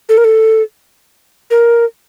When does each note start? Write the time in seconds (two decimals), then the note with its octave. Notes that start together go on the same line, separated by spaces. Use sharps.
0.09 A4
0.18 A#4
0.24 A4
1.51 A#4